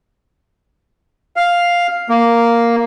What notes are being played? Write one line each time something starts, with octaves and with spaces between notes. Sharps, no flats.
F5
A#3